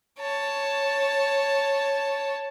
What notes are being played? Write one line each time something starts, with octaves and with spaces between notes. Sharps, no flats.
C#5 A5